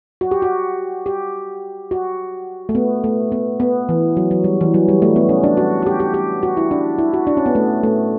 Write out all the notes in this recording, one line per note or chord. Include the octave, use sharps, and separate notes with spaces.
F#4
G4
F#4
G4
F#4
A3
B3
A3
B3
B3
E3
F#3
F#3
G3
E3
F#3
G3
A3
B3
C#4
D4
F#4
F#4
G4
G4
G4
F#4
E4
D4
E4
F#4
D4
C#4
B3
A3
A3